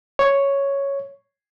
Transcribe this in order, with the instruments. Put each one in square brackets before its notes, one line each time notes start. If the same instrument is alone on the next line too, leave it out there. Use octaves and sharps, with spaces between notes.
[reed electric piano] C#5